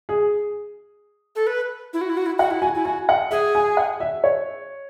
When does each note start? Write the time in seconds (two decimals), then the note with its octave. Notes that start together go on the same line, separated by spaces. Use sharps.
0.09 G#4
1.36 A4
1.47 B4
1.93 E4
2.01 F#4
2.10 E4
2.17 F#4
2.26 E4
2.39 F#4 F#5
2.51 E4
2.62 F#4 G#5
2.75 E4
2.85 F#4 G#5
3.09 F#5
3.31 G#4 E5
3.55 G#5
3.77 F#5
4.00 E5
4.24 C#5